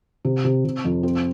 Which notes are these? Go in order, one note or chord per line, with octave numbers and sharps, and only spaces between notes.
C3
C3
C3
F2
C4